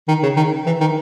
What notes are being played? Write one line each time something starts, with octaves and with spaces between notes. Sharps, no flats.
D#3
C#3
D#3
E3
D#3